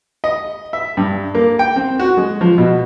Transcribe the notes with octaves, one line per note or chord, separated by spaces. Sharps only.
D#5
E5
G2
A#3
G5
C4
F#4
G#3
F3
B2